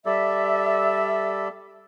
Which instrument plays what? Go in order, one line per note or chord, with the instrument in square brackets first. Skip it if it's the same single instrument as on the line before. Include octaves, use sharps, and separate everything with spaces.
[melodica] G3 A4 D5 [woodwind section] E5